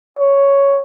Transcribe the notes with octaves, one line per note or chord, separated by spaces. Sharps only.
C#5